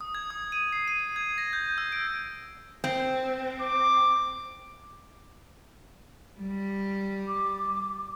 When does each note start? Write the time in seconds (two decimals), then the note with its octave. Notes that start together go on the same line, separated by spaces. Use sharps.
0.01 D#6
0.15 G#6
0.31 D#6
0.52 D#7
0.73 C7
0.88 D#7
1.16 G#6
1.38 A#6
1.53 G6
1.78 E6
1.92 D7
2.84 C4
3.61 D6
6.40 G3
7.28 D6